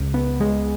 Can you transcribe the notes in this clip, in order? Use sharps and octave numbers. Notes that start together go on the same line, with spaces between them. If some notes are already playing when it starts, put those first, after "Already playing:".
Already playing: C#2
B3
G#3